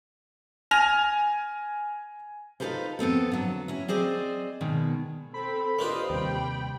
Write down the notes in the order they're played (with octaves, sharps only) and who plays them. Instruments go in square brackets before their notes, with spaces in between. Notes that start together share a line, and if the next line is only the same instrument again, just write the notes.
[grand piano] G#5 F6 A#6 F7
[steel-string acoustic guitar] D#4 F4 G4 A4 B4 C5
F2 B3 C4 A4
D3 F#3
C#4 E4
C4 G#4 C5 D5 D#5
B2 D#3 G#3
[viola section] C4 A4 [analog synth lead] B5
[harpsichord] A#3 D4 B4 [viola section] F4 G4 D#5 [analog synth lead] C5
[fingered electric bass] D#2 C3 [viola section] G3 G5 B5